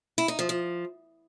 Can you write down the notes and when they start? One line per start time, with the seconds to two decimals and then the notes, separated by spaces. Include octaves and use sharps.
0.18 E4
0.28 D#4
0.39 F3
0.49 F3